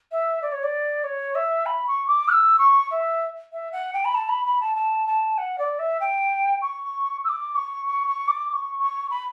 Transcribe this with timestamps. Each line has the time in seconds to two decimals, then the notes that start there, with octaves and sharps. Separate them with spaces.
0.11 E5
0.42 D5
0.52 C#5
0.63 D5
1.03 C#5
1.35 E5
1.66 B5
1.87 C#6
2.07 D6
2.28 F#6
2.32 E6
2.58 C#6
2.90 E5
3.52 E5
3.72 F#5
3.93 G5
4.04 B5
4.14 A5
4.29 B5
4.45 B5
4.60 A5
4.76 A5
5.07 A5
5.38 F#5
5.58 D5
5.79 E5
6.00 G5
6.61 C#6
7.24 E6
7.28 D6
7.55 C#6
7.86 C#6
8.07 C#6
8.28 D6
8.48 D6
8.53 C#6
8.79 C#6
9.10 B5